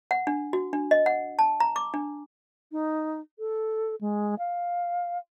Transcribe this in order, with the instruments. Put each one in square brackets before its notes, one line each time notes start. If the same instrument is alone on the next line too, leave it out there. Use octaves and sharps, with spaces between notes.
[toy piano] F#5
D4
F#4
D4
D#5
F#5
A5
A#5
D6
D4
[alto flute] D#4
A4
G#3
F5